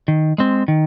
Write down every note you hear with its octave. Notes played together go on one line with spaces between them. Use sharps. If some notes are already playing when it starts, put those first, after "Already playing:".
D#3
G#3 C4
D#3